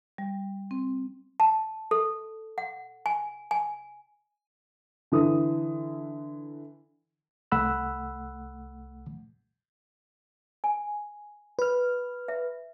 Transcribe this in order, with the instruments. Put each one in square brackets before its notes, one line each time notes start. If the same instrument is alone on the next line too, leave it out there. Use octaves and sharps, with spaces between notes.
[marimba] G3
C4
[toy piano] A5
A4
F#5
G#5
G#5
[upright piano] D3 E3 D#6
[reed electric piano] C2 A3 F#5 B5 E6 F#6
[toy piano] G#5
[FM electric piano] B4 F6
[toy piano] E5